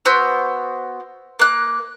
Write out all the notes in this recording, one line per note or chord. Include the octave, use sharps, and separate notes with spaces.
B3 F#4 C5 E6
A#3 F#6